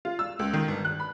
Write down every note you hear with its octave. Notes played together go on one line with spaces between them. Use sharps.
F4
E6
C#2
D#3
G1
F#6
B5